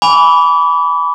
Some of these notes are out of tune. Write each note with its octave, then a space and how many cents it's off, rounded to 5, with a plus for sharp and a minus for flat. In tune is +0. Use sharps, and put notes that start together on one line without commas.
G#5 +0 B5 +0 D6 -35